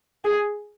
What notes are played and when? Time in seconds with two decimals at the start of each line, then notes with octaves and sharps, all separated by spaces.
0.25 G#4